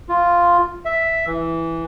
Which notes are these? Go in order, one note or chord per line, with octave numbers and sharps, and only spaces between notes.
F4
E5
E3